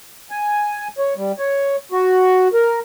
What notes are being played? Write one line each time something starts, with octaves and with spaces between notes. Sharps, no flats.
G#5
C#5
G3
C#5
F#4
A#4